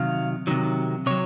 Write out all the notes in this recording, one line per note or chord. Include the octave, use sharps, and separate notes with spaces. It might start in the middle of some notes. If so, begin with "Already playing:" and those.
Already playing: C3 D#3 F#3 F5
C3 D#3 F#3
C3 F#3 C#5